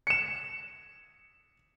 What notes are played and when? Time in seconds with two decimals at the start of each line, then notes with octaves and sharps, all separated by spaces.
0.07 C#7 E7